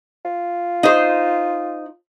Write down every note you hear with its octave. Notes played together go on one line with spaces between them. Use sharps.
F4
D#4 C5